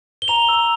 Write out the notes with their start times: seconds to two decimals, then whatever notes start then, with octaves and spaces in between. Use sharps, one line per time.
0.22 G7
0.28 A#5 F7
0.49 E6